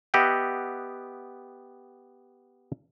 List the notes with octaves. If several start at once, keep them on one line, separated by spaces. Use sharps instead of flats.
B3 G4 D#5 E5 F#5 G5